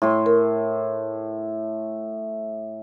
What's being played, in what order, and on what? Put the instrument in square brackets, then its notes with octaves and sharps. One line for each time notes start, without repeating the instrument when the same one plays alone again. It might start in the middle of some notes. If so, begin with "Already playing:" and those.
[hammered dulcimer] A2 C6
[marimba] A#4